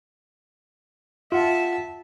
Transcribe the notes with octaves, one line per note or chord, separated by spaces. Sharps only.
F4 E5 F#5 A5